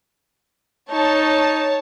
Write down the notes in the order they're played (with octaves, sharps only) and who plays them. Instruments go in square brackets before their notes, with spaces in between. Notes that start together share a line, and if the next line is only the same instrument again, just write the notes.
[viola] D#4 [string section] C#5 A5